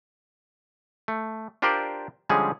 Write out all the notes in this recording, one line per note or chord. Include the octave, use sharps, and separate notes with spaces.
A3
D4 F4 G4 A#4 C5 D5
D3 F3 G3 G#3 C#4 G#4